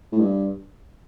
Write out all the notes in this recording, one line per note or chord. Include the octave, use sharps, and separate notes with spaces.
A2
G2